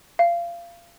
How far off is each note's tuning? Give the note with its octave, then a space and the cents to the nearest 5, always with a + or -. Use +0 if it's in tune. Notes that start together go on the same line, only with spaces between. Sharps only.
F5 -25